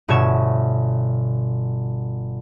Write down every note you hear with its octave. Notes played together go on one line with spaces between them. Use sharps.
G1 B2 C#5 E5 G#6 E7